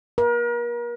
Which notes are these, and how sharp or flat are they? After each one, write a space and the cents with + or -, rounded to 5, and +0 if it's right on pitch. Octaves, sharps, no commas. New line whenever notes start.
A#4 +40